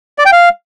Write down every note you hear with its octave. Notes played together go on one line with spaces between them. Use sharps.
D5
G5
F5